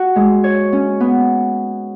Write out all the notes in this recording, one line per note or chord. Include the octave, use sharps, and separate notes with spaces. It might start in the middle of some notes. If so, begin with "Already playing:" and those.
Already playing: F#4
G#3
C#5
C#4
B3